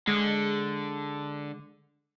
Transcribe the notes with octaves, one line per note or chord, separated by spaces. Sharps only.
D3 G#3